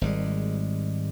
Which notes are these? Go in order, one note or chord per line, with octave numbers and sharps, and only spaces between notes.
G#1 G3 G#3